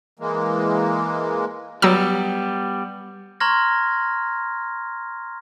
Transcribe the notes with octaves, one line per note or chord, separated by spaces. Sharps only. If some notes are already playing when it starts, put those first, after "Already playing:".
E3 G#3 A#3
F#3 G3 B3 A#5 E6
A#5 C6 C#6 F6 G#6 A#6